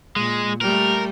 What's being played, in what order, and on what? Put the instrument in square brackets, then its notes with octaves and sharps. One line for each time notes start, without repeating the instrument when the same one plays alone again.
[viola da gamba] A#2 [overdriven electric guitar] G#3
[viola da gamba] G3 A3 [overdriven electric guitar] A#4